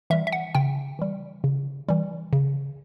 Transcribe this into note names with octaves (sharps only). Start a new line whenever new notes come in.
E3 G3 E5
E5
F#5
C#3 G5
E3 G3
C#3
E3 G3
C#3